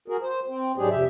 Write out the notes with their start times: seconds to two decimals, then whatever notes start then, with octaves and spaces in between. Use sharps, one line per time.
0.08 F#4 G#4 A#4
0.22 C5
0.48 C4
0.77 G#2 F#3 G#3 D4 G4 G#4
0.90 F2 C3 G4 E5